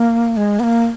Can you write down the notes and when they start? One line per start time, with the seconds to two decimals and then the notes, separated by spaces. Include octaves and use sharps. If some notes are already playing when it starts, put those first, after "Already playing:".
Already playing: A#3
0.37 G#3
0.59 B3
0.63 A#3